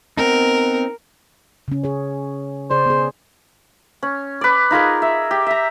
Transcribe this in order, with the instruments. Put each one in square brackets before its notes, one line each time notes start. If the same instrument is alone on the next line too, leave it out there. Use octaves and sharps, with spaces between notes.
[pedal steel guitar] B3 C4 D#4 [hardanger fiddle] A#4
[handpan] C#3 C#4
G#4 C#5
[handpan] C#3 G#4 D5 [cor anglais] C5
[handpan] B3 G#4
[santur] C#4
B4 D5
D#4 F4 G#4 A#4
E5
G4
E5 A#5